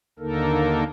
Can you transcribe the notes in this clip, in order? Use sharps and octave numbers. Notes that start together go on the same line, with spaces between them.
D#2 D3 A#3 D#4 A4 A#4